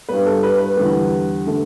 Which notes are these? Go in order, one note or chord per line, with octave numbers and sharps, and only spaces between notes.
G2 G3 B3 B4
A4
B4
B4
E2 D3 G3 B3
D3 A3